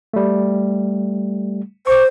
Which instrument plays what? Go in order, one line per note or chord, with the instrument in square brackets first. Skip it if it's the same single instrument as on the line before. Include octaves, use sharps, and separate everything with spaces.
[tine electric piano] G3 A3
[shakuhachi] C5 [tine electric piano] C#6 D6